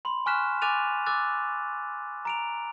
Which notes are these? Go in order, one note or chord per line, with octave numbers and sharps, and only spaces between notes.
B5 C6
G#5 C#6 F6 F#6 B6 E7
G#5 D6 F#6 A6 D#7 F7
D6 E6 F#6 A6
A#5 D7 F7